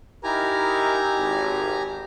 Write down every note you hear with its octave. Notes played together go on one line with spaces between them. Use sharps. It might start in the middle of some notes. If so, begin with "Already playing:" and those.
D#4 E4 G4 A#4 G#5 A#5
G#1